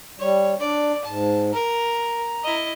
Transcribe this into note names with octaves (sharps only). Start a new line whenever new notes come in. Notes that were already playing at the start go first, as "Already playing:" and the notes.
G3 C#5
D4 D5
G#2 A5
A#4 A#5
E4 D#5